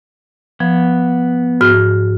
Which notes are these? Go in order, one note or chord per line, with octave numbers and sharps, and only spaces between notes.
F3 B3
G#2 F#4 F6